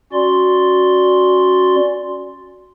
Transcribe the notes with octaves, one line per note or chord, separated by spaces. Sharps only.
C#4 F#4 D5 C6